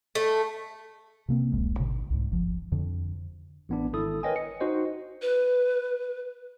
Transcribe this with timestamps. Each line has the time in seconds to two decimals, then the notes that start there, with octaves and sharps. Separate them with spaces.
0.15 A3
1.29 C3 A#3 C4
1.52 D1 A1 E2 G#3
1.79 G#1 B2 D3
2.10 C2 G#2
2.31 D1 G1 F3
2.72 F2 D3
3.69 A1 B3 D4
3.93 G#1 E4 A4 D#6
4.23 A#4 B4 C#5 D#5 G5 G#5
4.36 C#7
4.60 D#4 F#4 C5 D#5
5.22 B4